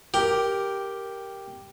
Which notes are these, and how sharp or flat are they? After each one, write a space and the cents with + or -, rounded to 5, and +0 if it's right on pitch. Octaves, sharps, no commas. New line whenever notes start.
G4 +0 A#4 +0